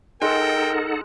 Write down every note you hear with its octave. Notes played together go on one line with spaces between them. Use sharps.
G#3 D#4 A4 A#4 F#5 G5